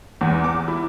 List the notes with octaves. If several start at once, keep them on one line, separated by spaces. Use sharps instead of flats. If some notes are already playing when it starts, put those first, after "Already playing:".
E2
D6
E4